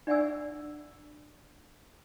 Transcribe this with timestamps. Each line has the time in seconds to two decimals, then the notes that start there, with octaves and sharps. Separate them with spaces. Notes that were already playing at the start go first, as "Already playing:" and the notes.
0.07 D4 D5 E5 F#5 G#5 E6